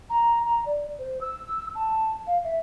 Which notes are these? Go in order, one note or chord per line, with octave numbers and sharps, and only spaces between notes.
A#5
A#5
D5
C5
E6
A5
F5
E5